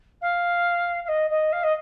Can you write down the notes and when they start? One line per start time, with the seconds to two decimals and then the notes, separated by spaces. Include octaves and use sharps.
0.21 F5
1.04 F5
1.08 D#5
1.30 D#5
1.52 F5
1.63 D#5